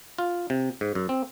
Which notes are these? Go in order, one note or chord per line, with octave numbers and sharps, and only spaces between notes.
F4
C3
G#2
F#2
C4